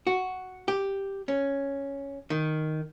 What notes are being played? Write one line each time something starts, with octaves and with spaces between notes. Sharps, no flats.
F#4
G4
C#4
D#3